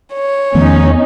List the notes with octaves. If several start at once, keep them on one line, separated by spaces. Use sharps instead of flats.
C#5
E2 D#3 F3 A3 C#4 D#4